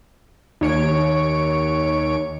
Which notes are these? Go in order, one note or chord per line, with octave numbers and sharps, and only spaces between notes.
D#2 C#5 D7